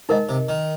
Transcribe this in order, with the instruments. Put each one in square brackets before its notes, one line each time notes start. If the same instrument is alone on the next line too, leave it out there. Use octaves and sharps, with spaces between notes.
[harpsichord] G#2 [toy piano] D#4 A#4 D#5
[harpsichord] C3
D#3